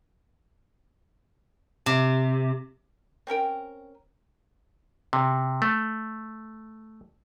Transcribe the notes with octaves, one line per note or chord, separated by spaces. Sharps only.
C3
C4 C#4 A#4 G5
C3
A3